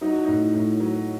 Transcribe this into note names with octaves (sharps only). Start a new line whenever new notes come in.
F#3 D#4
F#4
A2 D#4
A2
F#3